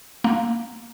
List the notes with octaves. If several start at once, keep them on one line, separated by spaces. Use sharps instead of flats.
A#3